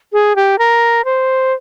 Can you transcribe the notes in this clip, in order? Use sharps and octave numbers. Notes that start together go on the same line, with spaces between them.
G#4
G4
A#4
C5